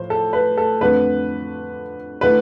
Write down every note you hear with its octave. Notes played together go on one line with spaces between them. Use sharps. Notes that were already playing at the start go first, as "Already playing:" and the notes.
Already playing: A2 F3 C5
A4
B4
A4
F2 D3 A3 D4 B4
D3 A3 E4 B4